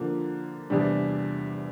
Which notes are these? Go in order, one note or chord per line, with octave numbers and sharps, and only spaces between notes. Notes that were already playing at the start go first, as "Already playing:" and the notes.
Already playing: D3 F3 A#3
E2 C3 G3 D4